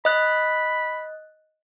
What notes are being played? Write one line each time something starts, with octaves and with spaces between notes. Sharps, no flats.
D#5 B5 F#6